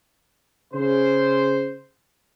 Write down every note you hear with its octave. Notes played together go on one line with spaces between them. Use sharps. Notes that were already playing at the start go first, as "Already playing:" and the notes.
C#3 C5